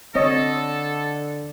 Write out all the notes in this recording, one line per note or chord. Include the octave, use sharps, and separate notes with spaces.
D3 C4 A4 C#5 D#5